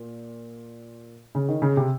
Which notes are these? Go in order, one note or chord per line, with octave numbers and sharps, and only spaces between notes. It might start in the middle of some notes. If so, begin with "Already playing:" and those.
Already playing: A#2
C#3
D#3
C#3
C3